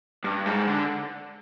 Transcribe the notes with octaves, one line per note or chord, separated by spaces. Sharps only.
G2
G#2
D3